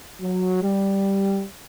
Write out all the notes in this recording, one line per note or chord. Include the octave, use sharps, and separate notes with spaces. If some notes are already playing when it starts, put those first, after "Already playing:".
F#3
G3